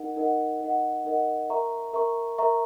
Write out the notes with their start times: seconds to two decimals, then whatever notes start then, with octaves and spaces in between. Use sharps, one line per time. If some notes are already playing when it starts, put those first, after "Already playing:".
Already playing: D#4 A#4 D#5 F#5
0.16 D#4 A#4 D#5 F#5
0.60 D#4 A#4 D#5 F#5
1.05 D#4 A#4 D#5 F#5
1.50 A#4 E5 A#5 C#6
1.94 A#4 E5 A#5 C#6
2.38 A#4 E5 A#5 C#6